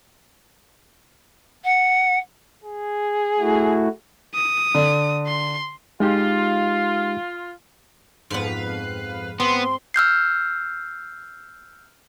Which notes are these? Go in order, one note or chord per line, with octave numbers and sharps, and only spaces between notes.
F#5
G#4
A3 E4 F#4
D#6
D3
C6
G#3 D#4 F4 G4
F2 G#2 B3 B4 F5
B3 C4 C6
E6 F6 G6 C7